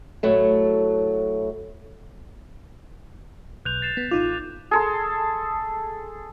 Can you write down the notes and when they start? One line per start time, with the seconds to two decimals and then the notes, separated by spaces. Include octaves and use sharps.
0.23 A2 F#3 A3
3.65 B1 F#6 G6 F7
3.82 A6 C7 E7
3.97 B3
4.11 A1 D#4 F4 D6
4.71 G#4 A4 C6